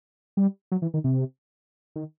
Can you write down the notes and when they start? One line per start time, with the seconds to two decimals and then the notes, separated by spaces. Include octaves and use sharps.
0.37 G3
0.72 F#3
0.82 E3
0.94 D#3
1.04 C3
1.96 D#3